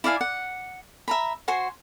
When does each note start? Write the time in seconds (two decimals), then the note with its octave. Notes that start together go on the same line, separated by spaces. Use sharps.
0.04 E4 D5 F5 G#5
0.21 F#5
1.08 E5 A#5 B5
1.48 F#4 C5 G#5 C6